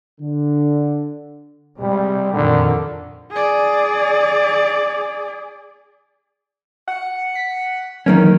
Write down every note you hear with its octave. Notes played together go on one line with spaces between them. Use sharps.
D3
C3 G3 G#3
F2 A#2 D3 D#3
G#4 D5
F#5
B6
D#3 E3 F#3 G#3 A#3 C#4